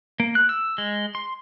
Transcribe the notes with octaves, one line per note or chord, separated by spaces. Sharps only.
A#3
F#6
E6
G#3
C6